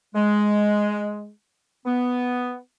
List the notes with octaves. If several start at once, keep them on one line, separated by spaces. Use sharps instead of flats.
G#3
B3